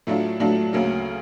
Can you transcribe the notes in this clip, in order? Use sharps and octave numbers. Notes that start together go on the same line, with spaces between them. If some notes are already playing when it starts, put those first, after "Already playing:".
A2 F#3 A3 D4 F4
A2 F#3 A3 D4 F4
D2 C#3 F#3 A#3